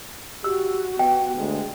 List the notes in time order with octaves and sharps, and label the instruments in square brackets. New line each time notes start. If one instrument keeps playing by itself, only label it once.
[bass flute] F#4 [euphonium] G4 [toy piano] E6
[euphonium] B3 [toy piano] G5
[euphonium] D2 [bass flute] G#3